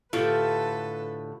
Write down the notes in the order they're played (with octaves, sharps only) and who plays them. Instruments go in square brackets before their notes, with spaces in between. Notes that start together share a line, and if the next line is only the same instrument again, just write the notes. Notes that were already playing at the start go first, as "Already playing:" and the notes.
[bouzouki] A2 D3 [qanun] F4 G4 D5 [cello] A4 B4